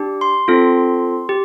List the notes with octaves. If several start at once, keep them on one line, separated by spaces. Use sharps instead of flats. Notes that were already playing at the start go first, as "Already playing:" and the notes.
Already playing: D4 G4
C6
C4 F4 A4
G4